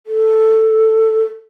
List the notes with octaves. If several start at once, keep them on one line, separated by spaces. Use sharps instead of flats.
A4